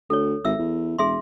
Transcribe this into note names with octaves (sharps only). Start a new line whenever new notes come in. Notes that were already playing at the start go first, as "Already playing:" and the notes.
D2 A4 C#5
G#1 E5 E6
E2
E1 G#4 E5 C6